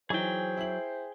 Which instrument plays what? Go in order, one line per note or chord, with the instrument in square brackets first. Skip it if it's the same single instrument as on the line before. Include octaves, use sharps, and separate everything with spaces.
[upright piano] E3 D#4 [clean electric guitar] F#3 [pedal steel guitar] G#4 G5 [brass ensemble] C5
[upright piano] E4 F#7